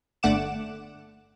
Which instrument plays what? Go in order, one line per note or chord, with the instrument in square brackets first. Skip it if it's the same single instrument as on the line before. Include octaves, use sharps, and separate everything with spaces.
[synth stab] G1 D3 A3 F#5 D6 E7